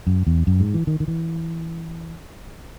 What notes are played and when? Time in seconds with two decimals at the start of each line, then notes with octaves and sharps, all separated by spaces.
0.07 F#2
0.27 E2
0.47 F#2
0.60 G#2
0.74 E3
0.87 D#3
1.00 D#3
1.08 E3